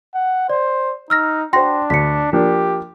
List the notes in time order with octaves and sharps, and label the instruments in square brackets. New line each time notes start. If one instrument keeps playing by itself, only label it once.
[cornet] F#5
[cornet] C5 [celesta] D5
[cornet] D#4 [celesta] E6 F6 A#6
[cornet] D4 [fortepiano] F#4 C5 [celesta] G5 C6 A#6
[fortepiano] D2 [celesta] B6 C#7
[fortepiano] F3 A#3 D4 [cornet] G4